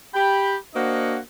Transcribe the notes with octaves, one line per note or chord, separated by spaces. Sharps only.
G4 G5 B5
A#3 D4 F#4 C5 D#5 F#5